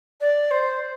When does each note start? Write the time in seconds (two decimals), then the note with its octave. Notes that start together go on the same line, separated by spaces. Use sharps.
0.20 D5
0.50 C5